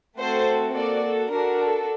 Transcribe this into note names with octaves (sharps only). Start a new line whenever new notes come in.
A3 C4 F#4 A4 C5
A#3 F#4 A4 D5
A4
D4 F#4 A4 A#4
A4